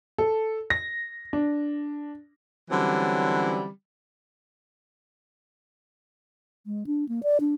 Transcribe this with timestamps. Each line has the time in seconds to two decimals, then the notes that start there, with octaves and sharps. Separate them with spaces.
0.18 A4
0.70 A#6
1.33 D4
2.70 D3 E3 F#3 G3 C4 C#4
6.66 G#3
6.87 D4
7.09 A#3
7.23 D5
7.40 D4